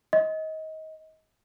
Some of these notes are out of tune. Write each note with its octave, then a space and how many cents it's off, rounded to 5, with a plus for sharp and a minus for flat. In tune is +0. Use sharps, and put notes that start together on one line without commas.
D#5 +25